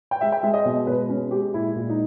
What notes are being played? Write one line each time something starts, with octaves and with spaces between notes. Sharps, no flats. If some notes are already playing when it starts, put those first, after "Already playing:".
G5
G#3 E5
G5
G#3 E5
D#5
B2 D#5
B2 B4
G#3 C#4
G#3 G4
A#2 E4
A#2
D#4